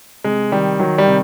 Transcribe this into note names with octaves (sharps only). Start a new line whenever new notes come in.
C3 G#3
D#3 G3
D#3 F#3
G3
C3